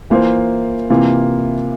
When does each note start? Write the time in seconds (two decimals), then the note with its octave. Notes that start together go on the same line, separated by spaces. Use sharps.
0.10 E3 A#3 F4 C5
0.90 C3 E3 A#3 F4